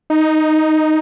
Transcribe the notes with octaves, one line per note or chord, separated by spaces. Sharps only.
D#4